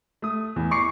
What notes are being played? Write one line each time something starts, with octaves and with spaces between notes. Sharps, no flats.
A3 D#6
E2
C#6 D6 C7 C#7